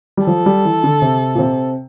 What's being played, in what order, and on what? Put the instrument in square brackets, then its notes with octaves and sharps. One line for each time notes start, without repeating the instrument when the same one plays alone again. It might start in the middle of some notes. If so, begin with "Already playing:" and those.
[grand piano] G3
[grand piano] F3 [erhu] A4
[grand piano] G3
E3
D3
C3
A#2
C3